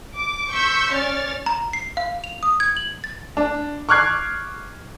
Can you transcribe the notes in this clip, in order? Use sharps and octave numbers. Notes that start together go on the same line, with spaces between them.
D6
C6 C#6 E6 G6 B6 C#7
C#4 C#5 D5 F6 A6
A#5
C7
F5
F7
D#6
G#6
F#7
A6
D4
C#6 D6 F6 F#6 G#6 C7